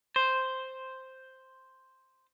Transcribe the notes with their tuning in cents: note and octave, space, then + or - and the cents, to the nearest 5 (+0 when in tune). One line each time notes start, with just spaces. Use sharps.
C5 +0